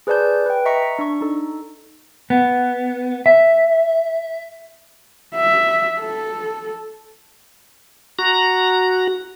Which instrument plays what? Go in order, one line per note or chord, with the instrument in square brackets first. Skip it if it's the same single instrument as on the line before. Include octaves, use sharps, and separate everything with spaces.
[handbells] G#4 B4 C5 D5 A5 G6
B4 G5
D#5 E5 A#5 C#6 B6 C#7
D4 C#6
D#4 A4
[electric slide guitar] B3
E5
[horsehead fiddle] E5
A4
[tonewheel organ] F#4 A#5